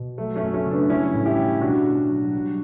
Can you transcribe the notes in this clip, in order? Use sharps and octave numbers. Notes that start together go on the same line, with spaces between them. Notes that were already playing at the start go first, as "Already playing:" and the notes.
Already playing: B2
F#3 A3
A3 C#4
F#2
A3 C#4
C#3
B3 D4
G3 C#4 E4
A2
E4 G4
E3
B2 D4 F#4
B2
F#3
G3